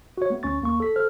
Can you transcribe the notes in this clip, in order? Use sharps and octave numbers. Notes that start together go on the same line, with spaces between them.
F#4 C#5
A3 B3
D2 C#4 C#6 A6
D#2 A#3 C#6
A4 B6
A4 C5 F6